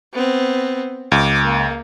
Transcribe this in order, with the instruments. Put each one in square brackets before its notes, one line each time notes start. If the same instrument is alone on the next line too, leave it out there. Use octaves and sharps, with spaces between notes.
[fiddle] B3 C4
[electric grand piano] C#2 [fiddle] D6
[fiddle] A#3